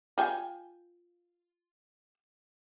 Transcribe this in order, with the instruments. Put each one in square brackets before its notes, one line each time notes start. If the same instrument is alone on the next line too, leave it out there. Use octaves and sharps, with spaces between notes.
[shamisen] F4 G5 G#5